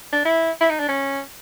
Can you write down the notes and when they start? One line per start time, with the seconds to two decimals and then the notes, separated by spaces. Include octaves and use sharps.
0.13 D4
0.25 E4
0.61 E4
0.70 D#4
0.79 D4
0.88 C#4